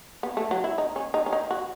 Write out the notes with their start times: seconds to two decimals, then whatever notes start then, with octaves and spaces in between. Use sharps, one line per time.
0.23 B3
0.37 A3
0.51 F#3
0.64 E4
0.78 D#4
0.96 C#4
1.14 D#4
1.26 C#4
1.33 D#4
1.51 F#4